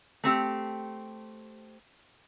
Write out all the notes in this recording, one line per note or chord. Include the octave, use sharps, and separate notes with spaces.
A3 C4 G4